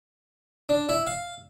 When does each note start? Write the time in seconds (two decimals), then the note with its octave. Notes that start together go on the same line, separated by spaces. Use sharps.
0.69 D4
0.89 E4
1.07 F5